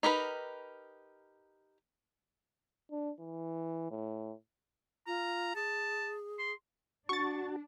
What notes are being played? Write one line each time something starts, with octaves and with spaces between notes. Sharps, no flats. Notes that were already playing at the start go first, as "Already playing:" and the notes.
D#4 G4 A#4 B4
D4
E3
A2
F4 A#5
G#4 A5
C6
D4 F#4 A5 C#6 A6